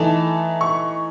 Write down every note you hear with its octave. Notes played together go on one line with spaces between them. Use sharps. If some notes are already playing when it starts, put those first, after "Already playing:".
Already playing: E3 A3 D#4 A5
C#6